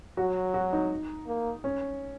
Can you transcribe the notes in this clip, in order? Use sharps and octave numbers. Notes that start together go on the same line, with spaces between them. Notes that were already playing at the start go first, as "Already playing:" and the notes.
F#3 F#4
F#4
D#4
A#3
C#4